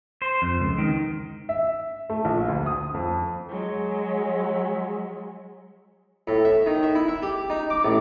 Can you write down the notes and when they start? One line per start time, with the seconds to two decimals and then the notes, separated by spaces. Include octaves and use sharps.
0.22 C5
0.42 F2
0.60 C#2
0.79 D#3
1.49 E5
2.10 A3
2.25 A#1
2.48 D2
2.66 D#6
2.94 F2
3.49 F#3 G#3
6.28 A2
6.45 E5
6.66 D#3
6.83 E5
6.95 E4
7.08 E5
7.23 G4
7.50 D#4
7.70 D6
7.85 A1